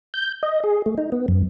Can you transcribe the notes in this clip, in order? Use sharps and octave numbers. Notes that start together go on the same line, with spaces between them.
G6
D#5
G#4
A3
D#4
B3
F#2